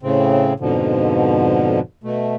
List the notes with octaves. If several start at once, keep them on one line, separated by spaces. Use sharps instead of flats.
A2 C#3 C4
F2 G#2 B2 D3 F3
B2 A3